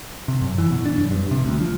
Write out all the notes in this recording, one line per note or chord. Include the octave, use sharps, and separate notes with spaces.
C3
F#2
E3
B2
D4
F#2
G2
C3
D2
F3